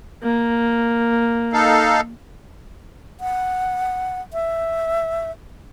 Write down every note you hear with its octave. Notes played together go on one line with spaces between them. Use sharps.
A#3
D#4 A4 F5
F#5
E5